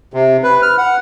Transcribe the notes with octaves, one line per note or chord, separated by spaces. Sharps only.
C3
B4
F6
F#5